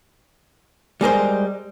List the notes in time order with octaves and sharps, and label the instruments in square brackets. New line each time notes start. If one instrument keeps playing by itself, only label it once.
[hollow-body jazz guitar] G3 G#3 A#4 C5